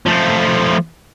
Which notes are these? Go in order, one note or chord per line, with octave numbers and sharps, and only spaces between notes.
F3 A3